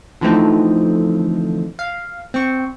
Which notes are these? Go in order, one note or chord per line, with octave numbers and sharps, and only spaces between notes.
D3 E3 F3 A3 C4 D#4
F5
C4 C#6